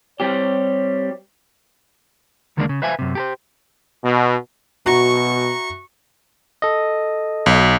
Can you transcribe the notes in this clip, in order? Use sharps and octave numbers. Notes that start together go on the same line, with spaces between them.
G3 C4 G4 C#5
D2 D3 D#3 G#3 A#3 D4
C#3
B4 C5 E5 F5 G#5
F#2 C3
G4 A4 C5
B2
B2 F#4 E5 A#5 C#6
A4 D#5
B1